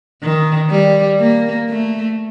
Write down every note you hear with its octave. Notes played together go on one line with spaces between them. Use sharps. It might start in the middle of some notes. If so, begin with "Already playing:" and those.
D#3
G3
A#3
A3